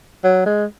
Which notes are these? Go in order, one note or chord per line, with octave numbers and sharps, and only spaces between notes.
F#3
G#3